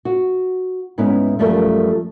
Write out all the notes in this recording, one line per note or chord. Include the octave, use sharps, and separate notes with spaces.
F#4
G#2 B3 C#4 E4 B4
F#2 F3 G3 A3 A#4 E5